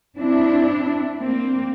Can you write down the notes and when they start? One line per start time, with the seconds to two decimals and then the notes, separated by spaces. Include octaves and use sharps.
0.18 C4 D4 E4
1.19 A#3 C4